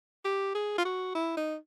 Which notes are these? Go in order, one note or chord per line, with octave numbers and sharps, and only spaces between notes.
G4
G#4
F4
F#4
E4
D#4